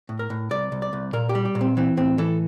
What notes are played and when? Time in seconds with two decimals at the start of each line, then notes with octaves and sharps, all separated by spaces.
0.09 A2
0.19 A#4
0.30 A2
0.51 C2 D5
0.72 C2
0.82 D5
0.93 C2
1.13 A#2 A#4
1.29 G4
1.35 G3
1.45 G4
1.55 A#2
1.61 C4
1.77 E3 C4
1.97 A2 C4
2.18 E3 A4